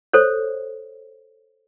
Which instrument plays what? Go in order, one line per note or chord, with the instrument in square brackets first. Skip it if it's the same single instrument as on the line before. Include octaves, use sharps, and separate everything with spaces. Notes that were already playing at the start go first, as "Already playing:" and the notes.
[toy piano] A4 C5 C#5